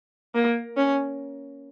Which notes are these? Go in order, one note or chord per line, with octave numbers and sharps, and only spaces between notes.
A#3
C#4